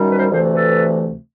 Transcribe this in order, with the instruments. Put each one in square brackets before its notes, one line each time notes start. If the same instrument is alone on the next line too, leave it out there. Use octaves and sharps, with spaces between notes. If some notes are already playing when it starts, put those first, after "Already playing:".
Already playing: [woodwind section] F#2 D#3 G3
B4
A#4 C5
D2 C3 E3 A3 A#4 C5
A4 B4